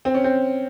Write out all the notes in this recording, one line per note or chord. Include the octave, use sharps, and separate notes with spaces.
C4
C#4
C4